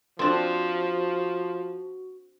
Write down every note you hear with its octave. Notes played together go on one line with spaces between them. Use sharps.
F3 C4 D4 F#4